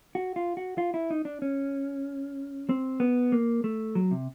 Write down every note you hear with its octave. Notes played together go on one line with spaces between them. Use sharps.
F#4
F4
F#4
F4
E4
D#4
D4
C#4
C4
B3
A#3
A3
F#3
C3